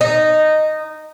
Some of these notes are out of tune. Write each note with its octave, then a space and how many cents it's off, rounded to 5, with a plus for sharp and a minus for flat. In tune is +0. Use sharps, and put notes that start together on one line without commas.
D#4 -10